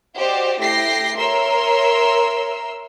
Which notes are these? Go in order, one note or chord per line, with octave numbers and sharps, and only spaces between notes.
F#4 G4 C5 D5 D#5
A3 E4 G4 G5 A#6 C7
A#4 C#5 E5 C6 E6